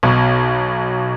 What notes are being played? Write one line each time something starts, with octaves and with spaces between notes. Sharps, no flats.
B1 B2